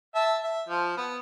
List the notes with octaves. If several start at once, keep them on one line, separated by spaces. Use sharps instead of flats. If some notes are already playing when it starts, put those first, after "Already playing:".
E5 A5
E5
F3
B3